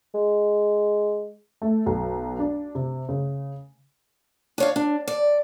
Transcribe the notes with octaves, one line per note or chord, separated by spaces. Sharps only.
G#3
A3
B1
D4
C3
C#3
D4 C#5 F5
D4
D5